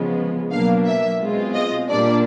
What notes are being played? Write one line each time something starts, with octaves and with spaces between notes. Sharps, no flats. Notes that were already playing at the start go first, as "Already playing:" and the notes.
Already playing: C#3 F3 G#3 B3
B2 F#3 A#3 D4 F5
E5
B2 G#3 C4 F4
D#5
A#2 G3 A#3 D4 D5